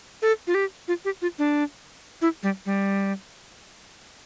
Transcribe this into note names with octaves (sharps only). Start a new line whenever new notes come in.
A4
F4
G4
F4
G4
F4
D4
E4
G3
G3